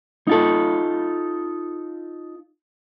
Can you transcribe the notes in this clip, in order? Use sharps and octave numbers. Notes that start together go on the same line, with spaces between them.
D#4 F4 A4